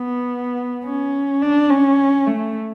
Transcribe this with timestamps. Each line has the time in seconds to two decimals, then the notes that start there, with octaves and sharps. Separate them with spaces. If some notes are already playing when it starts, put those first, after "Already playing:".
Already playing: B3
0.86 C#4
1.42 D4
1.71 C#4
2.27 A3